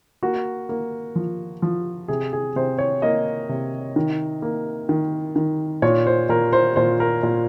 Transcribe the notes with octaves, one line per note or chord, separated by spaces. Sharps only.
A#3 F#4
A#3
F3
F3
C3 G#4
G#4
C3 C5
C#5
A#3 D#5
C3
D#3
A#3
D#3
D#3
A#2 C#5
C5
A#2 A#4
C5
A#2 C5
A#4
A#2